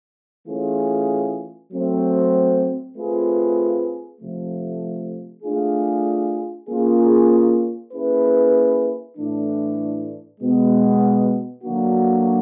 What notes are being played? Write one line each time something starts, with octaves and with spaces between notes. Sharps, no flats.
E3 A3 C#4 F4 G#4
F#3 A3 C4
A3 C4 F4 G#4 B4
C3 F3 A3
A3 D4 F4 G#4
A#3 C#4 F4 G#4
A#3 C#4 E4 G#4 B4
A2 E3 A3 D4
B2 G#3 B3
D3 F#3 A#3 D4 F#4